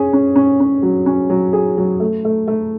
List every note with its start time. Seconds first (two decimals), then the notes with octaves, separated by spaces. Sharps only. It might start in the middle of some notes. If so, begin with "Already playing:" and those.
Already playing: C#4 G#4
0.13 C#4
0.36 C#4
0.60 C#4
0.83 F#3
1.06 C#4
1.30 F#3
1.53 G#4
1.77 F#3
2.00 A3
2.25 A3
2.48 A3